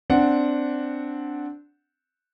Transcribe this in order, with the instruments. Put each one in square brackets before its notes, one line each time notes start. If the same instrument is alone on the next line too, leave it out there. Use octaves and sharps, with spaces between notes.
[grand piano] C4 D4 F#5